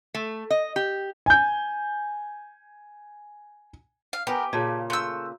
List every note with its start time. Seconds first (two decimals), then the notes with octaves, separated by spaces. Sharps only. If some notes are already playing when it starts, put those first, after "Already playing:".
0.14 A3
0.50 D#5
0.76 G4
1.26 G#5 G6
4.13 F5
4.27 B3 G4 A#4 G5 G#5
4.53 A#2 C#3 G#4 A5 G#6
4.90 A3 C6 E6 F#6 G6